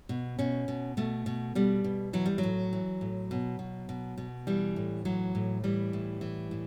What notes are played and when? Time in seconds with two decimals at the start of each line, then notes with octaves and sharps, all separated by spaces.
0.09 B2
0.38 B2 C#4
0.68 B2
0.97 B2 A3
1.26 B2
1.55 B2 G3
1.84 B2
2.13 E3 F#3
2.26 G3
2.38 F#3
2.43 A2
2.73 E3
3.01 A2
3.31 B2
3.59 B2
3.89 B2
4.18 B2
4.47 E3 G3
4.76 A2
5.05 E3 F#3
5.35 A2
5.64 E3 G3
5.93 A2
6.21 E3
6.51 A2